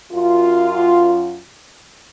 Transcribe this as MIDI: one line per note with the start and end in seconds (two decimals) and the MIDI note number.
0.12 1.39 42
0.12 1.39 65